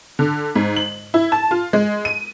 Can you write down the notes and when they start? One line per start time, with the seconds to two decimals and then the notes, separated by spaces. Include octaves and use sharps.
0.19 D3
0.55 G#2
0.76 F#7
1.14 E4
1.32 A5
1.51 F4
1.73 G#3
2.05 D#7